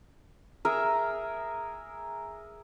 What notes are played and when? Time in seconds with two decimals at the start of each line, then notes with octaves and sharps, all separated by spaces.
0.65 G#4 A#4 E5 A#5